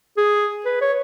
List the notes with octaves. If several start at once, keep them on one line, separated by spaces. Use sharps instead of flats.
G#4
B4
C#5